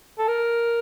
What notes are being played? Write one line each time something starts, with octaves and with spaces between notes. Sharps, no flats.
A4
A#4